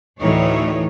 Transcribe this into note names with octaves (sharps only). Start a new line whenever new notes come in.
D2 A2 D#3 E3 D#4 C#5